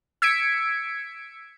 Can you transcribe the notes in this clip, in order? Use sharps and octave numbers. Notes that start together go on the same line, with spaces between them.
E6 G#6 B6 C#7 D7